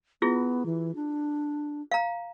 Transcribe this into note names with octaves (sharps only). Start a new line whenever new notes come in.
B3 E4 F4 G#4
E3
D4
F5 A#5